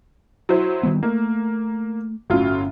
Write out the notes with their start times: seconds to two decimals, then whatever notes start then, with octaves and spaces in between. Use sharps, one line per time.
0.49 F#3 E4 C5
0.83 D#3 G3 B3
1.03 A3 A#3
2.30 G1 A2 F#3 C#4 F4